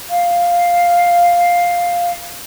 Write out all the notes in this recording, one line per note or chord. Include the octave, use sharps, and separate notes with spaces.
F5